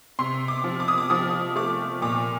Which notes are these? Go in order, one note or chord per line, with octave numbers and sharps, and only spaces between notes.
C3 C6
D6
F3
D6
D#6
D6
F3 D#6
A3 D6
A#2 D6